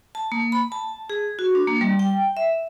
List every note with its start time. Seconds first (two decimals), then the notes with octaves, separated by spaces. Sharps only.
0.15 A5
0.32 A#3
0.52 B5
0.72 A5
1.10 G#4
1.39 F#4
1.55 D4
1.68 A#3
1.81 G3
1.99 G5
2.37 E5